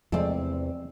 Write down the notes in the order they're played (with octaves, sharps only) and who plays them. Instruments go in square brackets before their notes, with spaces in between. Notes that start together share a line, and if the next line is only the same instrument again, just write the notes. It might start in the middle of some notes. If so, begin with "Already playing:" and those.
[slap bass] E2 C3 [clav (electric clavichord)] F3 G#3 A3 [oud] C4 D5